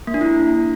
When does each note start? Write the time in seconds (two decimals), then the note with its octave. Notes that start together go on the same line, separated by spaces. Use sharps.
0.07 A#3
0.14 D4
0.21 E4